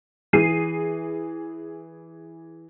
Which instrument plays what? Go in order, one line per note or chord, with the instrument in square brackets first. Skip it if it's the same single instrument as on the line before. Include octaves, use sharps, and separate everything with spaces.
[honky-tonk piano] E3 G#4 C7 D#7